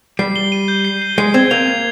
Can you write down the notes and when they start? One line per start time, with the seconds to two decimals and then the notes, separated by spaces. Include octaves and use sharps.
0.19 G3 C7
0.36 G7
0.52 D#7
0.68 G6
0.85 C7
1.02 G7
1.18 G#3 C7
1.34 C4 G#6
1.51 A#3 F7
1.68 G#6